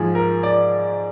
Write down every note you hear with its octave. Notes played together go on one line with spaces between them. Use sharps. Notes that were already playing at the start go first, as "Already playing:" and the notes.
Already playing: G#2 F3 G#4
A#4
D5